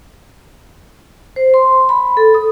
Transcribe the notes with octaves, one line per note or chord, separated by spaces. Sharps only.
C5
C6
B5
A4
D#6